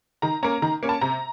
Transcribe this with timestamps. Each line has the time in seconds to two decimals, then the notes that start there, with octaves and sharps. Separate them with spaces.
0.22 D#3 A#5
0.43 A#3 C#4 A#5
0.62 D#3 A#5
0.83 A#3 C#4
0.89 A5
1.01 C3 A#5